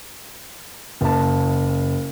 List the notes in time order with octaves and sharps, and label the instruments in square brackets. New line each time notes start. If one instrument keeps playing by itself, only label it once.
[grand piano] F#1 A5